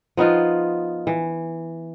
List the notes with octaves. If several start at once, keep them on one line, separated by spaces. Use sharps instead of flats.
F3 B3 D#4 F4
E3